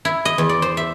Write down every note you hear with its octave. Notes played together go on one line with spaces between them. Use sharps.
E4
D#5
E2
D5
C5
E5